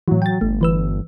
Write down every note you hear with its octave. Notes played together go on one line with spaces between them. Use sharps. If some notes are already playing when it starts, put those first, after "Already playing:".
A2 E3 F#3
G5 A6
G1 A3
E3 B4 E6